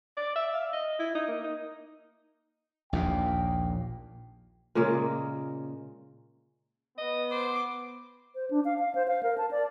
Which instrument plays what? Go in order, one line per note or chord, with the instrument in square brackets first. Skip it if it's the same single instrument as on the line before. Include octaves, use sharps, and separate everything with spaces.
[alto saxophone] D5
E5
F5
D#5
E4
D#4
A#3
D#4
[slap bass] A#1 D#2 A#2 [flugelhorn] G5
[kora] A#2 C#3 G#3 A#3
[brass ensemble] B3 [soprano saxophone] D#5
[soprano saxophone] C5 [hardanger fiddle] D6
[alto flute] C5
D4
F5
F5
C5
F5
A#4
A5
D5